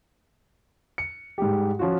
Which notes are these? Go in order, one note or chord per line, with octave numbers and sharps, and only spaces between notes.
C#7
G#2 G3 G4
F3 C#4 F4 F#4